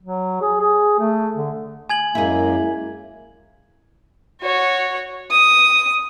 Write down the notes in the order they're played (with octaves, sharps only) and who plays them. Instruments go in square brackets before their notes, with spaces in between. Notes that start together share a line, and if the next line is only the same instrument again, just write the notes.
[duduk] F#3
G#4
G#4
A3
D3
[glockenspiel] G#5 G#6 F#7
[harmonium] F#2 G#3 A#3 [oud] E4 G#4
[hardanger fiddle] F#4 C#5
D#6